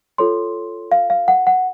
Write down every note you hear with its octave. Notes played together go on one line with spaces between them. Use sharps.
F4 A4 C#5 C6
F5
F5
F#5
F#5